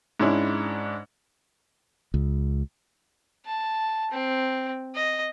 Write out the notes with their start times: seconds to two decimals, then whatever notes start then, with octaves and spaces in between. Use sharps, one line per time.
0.20 G#2 G#3 C#4 D4 E4
2.14 C#2
3.46 A5
4.11 C4
4.95 D#5